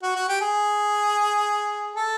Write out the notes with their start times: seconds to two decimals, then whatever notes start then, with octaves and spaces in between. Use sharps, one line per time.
0.03 F#4
0.16 F#4
0.28 G4
0.41 G#4
1.96 A4